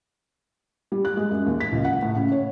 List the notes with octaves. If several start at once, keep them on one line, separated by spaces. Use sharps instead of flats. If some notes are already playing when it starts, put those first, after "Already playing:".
G3
F#6
G#3
F#2
D#2
B6
C#2
F#5
A2
C#3
C#5